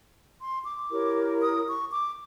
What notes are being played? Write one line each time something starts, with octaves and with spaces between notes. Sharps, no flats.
C6
D6
E4 G4 A#4 C#5
D#6
C#6
D6